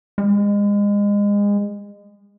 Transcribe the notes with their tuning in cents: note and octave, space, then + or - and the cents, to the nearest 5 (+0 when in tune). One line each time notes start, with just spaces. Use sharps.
G#3 -30